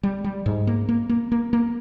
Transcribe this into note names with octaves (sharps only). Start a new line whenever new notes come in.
G3
G3
G#2
A#3
A#3
A#3
A#3
A#3